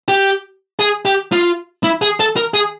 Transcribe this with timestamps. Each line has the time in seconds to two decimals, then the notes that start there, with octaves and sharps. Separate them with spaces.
0.08 G4
0.79 G#4
1.05 G4
1.32 F4
1.84 E4
2.02 G#4
2.20 A4
2.36 A#4
2.54 G#4